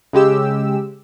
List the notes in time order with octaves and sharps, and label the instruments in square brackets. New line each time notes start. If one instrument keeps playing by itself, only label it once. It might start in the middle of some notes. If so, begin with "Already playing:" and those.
[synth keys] C#3 G#3 G4 E6